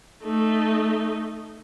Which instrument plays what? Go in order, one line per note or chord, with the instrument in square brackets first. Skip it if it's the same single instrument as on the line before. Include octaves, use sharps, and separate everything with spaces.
[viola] A3 D#4